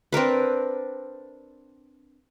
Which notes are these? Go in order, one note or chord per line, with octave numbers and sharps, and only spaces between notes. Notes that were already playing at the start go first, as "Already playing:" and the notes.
C4 D4 A#4 B4